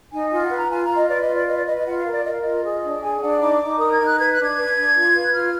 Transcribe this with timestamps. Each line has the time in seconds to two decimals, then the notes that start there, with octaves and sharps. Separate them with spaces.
0.12 D#4 G#5
0.31 F4 G#5
0.44 F#5
0.51 B4
0.57 A#5
0.70 F4 G#5
0.83 A#5
0.89 F4
0.95 D#5
1.09 B4 D5
1.21 D#5
1.28 F4
1.35 D5
1.47 B4 D#5
1.56 D5
1.66 B4 D#5
1.76 D#5
1.85 F4 F#5
1.98 F5
2.05 A#4
2.12 D5
2.25 A#4 D#5
2.32 F5
2.41 F4 D#5
2.64 G#4
2.83 D4
3.01 G#4 G#5
3.22 D4 F#5
3.40 D#4 D6
3.61 D#4
3.79 A#4 D#6
3.92 G#6
3.99 D#4
4.06 F#6
4.18 B4 G#6
4.31 F#6
4.38 D4
4.44 G#6
4.57 B4
4.76 D4
4.95 F4
5.15 B4
5.24 F#6
5.34 F4 F6